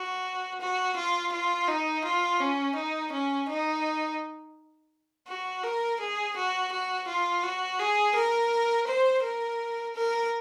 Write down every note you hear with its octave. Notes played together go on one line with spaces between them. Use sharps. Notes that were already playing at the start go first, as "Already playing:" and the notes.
Already playing: F#4
F#4
F4
F4
D#4
F4
C#4
D#4
C#4
D#4
F#4
A#4
G#4
F#4
F#4
F4
F#4
G#4
A#4
C5
A#4
A#4